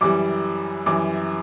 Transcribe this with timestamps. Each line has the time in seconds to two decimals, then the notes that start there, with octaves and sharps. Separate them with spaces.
0.01 F#2 E3 G3 D6
0.86 F#2 E3 G3 D6